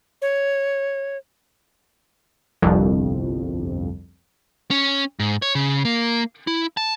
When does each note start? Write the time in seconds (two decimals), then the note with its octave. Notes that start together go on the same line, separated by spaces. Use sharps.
0.22 C#5
2.62 G1 C2 F2
4.71 C#4
5.20 G#2
5.42 C#5
5.55 C#3
5.85 A#3
6.47 E4
6.77 A5